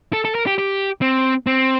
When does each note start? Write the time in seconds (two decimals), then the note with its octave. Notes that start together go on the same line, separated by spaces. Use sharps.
0.13 A4
0.25 A4
0.35 A#4
0.47 G4
0.58 G4
1.02 C4
1.47 C4